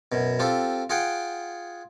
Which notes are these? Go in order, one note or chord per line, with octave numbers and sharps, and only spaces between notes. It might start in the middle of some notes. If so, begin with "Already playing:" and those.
F#2 B2
C4 F4 G4 A4
F4 G#4 F#5 G5